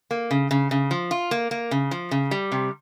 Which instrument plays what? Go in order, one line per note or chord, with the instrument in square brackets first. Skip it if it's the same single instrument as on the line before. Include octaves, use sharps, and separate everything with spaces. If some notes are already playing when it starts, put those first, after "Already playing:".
[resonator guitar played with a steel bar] A#3
C#3
C#3
C#3
F3
F4
A#3
A#3
C#3
F3
C#3
G3
C3